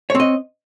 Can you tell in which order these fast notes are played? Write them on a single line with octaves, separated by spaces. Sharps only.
C#5 C4 D#5